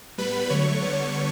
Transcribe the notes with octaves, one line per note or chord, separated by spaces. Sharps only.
A2 G3 B3 B4 B5
D3 F#3 A3 C#5 C#6
D3 G3 B3